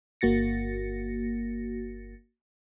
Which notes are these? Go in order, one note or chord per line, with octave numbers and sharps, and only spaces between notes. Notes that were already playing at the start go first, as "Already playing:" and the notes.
G1 A#3 F#4 A6 A#6 C#7